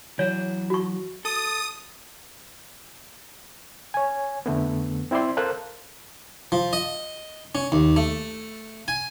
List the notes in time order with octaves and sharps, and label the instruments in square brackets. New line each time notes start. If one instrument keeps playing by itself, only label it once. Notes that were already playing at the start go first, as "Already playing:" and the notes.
[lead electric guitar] E3 F#3 [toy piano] C#5
[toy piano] F#4 C#6
[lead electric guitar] A4 [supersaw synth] D#6
[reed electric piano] C#5 G#5
F2 D3 A3 B3
C4 E4 C5 D5 C6
A4 A#4 C5 F5 F#6
[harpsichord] F3
D#5
C#4
D#2
A3
G#5